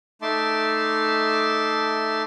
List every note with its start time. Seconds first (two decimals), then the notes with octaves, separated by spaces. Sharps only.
0.22 A3 D#4 E5 A5 C6 D6